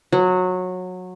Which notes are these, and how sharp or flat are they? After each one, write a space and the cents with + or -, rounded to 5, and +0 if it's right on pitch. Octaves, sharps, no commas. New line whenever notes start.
F#3 -20